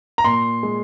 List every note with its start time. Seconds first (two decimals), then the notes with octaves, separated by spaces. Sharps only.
0.18 A#5
0.24 A#2 C6
0.63 G#3